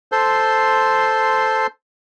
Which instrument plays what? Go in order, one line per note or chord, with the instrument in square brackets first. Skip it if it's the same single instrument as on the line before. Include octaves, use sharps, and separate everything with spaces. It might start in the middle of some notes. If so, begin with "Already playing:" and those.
[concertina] A4 C5 C6